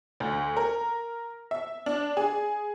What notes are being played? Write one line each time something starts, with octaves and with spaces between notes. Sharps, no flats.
D2
A#4
E5
D4
G#4